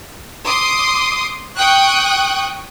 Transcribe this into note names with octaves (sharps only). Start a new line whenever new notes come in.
C6 D6 D#6
G5 C#6 D#6 F#6